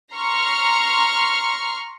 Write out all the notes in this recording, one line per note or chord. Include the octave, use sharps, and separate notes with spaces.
A#5 C6 C#6 F6